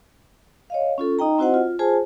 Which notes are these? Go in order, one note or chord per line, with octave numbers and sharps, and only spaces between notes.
C#5 D#5 F5
C#4 F4 A4
D#4 D#5 G5 A#5
C4 E4 F#4 C5 D#5 F#5
F4
F4 G#4 C5 G#5 A5